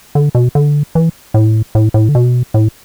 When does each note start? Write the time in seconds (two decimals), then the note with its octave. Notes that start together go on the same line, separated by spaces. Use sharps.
0.15 D3
0.35 B2
0.55 D3
0.95 E3
1.34 A2
1.75 A2
1.94 A2
2.09 D3
2.15 B2
2.54 A2